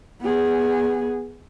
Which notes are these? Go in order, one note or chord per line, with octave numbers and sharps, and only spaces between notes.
B3 G#4